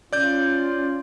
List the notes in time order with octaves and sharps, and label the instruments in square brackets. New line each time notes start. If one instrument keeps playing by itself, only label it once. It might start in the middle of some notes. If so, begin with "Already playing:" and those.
[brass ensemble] C#4 F4 [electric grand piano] D5 G6